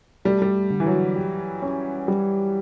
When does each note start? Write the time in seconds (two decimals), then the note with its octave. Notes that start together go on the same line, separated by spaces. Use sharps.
0.25 G3 A3
0.42 G3
0.70 D3
0.80 E3
0.86 F#3
1.16 G4
1.62 C#4
2.08 G3